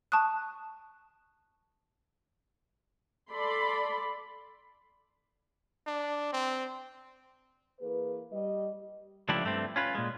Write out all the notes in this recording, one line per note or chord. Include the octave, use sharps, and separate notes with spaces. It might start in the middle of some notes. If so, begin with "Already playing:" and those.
A5 C#6 D#6 F#6
A4 D5 B5 C6
D4
C4
E3 A#3 G#4 B4
G3 D#5
C#2 F3 A3 D4 E4 G4
G2 A3 C4
C#4 F4 B4
A#2 G#3